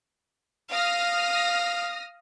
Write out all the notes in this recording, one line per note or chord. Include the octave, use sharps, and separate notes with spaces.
F5 D#6 F6 A#6